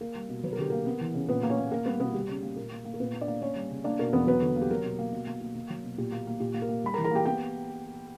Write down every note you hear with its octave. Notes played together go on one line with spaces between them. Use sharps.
A#3 A#4
G3
B2
F#3 B4
A#4
D3 G4
A#3 A#4
B3
E3
C#3
A#2 B3 B4
A#3
C#4 C#5
A#3
A#3 A#4
G3 B3 B4
B2 B3 B4
G3 G4
C#3
A#3
A#2 A#4
A#3
A#3
A#4
A#2 B3 B4
A#3
D4 D5
A#3
A#3 C#4 C#5
G3
C#3
A#3 D4 D5
B2 A#4
E2 B3 B4
F#3 B3 B4
D3
A#3
G4
F#3 A#4
B2
A#3
B2
A#3
A#3
A#3
F#3
B2
A#2 G4
A#3
A#3
A#2 G4
A#3
A#4
A#3
G3 B5
A#4 A#5
E3
A#4 A#5
A#3 G4 G5
B3 G4 G5